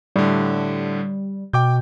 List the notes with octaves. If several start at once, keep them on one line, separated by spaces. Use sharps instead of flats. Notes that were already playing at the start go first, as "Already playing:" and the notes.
A2 D3 G3
B2 G5 D6 G6